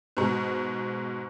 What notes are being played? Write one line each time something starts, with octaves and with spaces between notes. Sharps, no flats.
G#2 B2